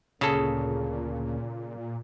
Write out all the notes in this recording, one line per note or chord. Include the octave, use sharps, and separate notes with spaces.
D2 A#2 C#3 A#3 C#4 G#4 A4